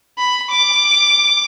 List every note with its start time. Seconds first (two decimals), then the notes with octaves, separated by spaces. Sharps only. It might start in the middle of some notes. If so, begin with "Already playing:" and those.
0.18 B5
0.50 D6